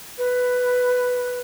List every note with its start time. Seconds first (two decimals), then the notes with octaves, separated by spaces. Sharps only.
0.18 B4